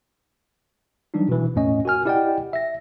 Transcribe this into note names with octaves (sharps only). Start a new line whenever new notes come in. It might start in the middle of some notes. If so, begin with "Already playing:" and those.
E3 F#3 G3 D4 D#4
B2 E3
E2 A2 A3 C#4 D#5
F#4 A#4 G#5 F6
E4 G4 D5 D#5 F#5 G5
E5 A#6